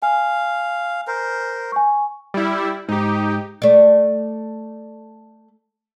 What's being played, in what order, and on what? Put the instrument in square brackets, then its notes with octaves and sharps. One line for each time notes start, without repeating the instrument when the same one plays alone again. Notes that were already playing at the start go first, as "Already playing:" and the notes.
[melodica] F5 [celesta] G#5
[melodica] A#4 C5
[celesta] G#5 C#6
[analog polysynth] G3 E4
[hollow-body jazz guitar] G#2 [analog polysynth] D#4 G4
[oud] A3 D5